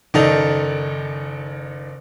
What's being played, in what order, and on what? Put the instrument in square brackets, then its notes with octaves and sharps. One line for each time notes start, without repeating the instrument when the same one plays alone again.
[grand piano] F#1 D#3 D#4 A4 D5 F7